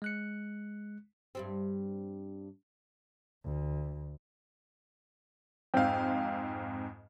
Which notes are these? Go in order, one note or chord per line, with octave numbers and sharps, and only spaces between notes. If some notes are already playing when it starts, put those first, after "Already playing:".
G#3 F#6 C#7
G2 G3 C4
D2
F2 G#2 C4 F5 G5